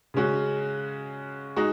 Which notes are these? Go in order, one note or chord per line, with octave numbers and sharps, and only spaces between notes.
C#3 G#3 C#4 F#4
G#3 D#4 F#4